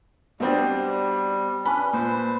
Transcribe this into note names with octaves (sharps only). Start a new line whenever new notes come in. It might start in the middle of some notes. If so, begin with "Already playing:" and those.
B2 G3 C4 D4
C#4 D4 B4 B5
A#2 B4 C5